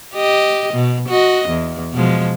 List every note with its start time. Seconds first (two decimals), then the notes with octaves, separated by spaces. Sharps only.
0.15 G4 D#5
0.73 B2
1.08 F#4 D#5
1.48 E2
1.94 B2 F3 G#3